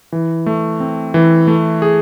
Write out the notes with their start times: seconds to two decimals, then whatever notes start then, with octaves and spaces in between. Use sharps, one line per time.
0.12 E3
0.46 A3
0.80 C4
1.14 E3
1.47 A3
1.82 G#4